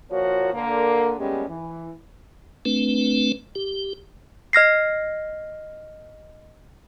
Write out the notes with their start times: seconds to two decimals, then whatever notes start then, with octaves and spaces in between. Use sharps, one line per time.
0.10 A#2 F3 A#3 F#4 C#5
0.53 D3 A#3 A#4
1.17 G3 G#3 A#3 B3 C#4 G4
1.48 E3
2.65 A3 C4 D4 B4
3.55 G4
4.53 D#5 F6 A#6 C7